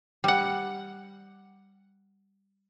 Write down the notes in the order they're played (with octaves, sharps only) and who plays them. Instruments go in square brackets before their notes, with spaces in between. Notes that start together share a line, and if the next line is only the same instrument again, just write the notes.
[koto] G3 F#5